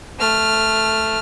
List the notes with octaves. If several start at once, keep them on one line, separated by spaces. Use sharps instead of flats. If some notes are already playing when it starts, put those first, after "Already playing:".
A3 F6